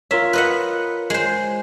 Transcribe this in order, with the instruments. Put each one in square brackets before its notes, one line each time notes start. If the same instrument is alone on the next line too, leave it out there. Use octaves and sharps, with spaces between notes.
[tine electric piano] F4 A#4 C#5 [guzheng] E5
[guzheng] B4 D#5 F#5
G#3 C5